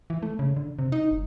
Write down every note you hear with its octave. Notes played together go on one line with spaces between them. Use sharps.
E3
A3
C#3
D3
C3
D#4
G1